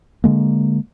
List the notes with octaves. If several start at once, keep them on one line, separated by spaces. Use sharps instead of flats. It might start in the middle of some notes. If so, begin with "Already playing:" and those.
D3 G#3 A#3